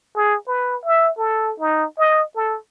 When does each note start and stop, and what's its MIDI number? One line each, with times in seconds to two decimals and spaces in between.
0.16 0.36 68
0.47 0.77 71
0.85 1.10 76
1.17 1.52 69
1.60 1.85 63
1.98 2.23 75
2.36 2.57 69